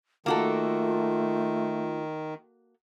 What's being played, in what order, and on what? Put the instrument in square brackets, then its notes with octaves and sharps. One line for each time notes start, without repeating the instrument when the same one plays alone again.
[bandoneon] D#3 [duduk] A3 [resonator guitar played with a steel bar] A#3 F#4 A4 [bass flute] F4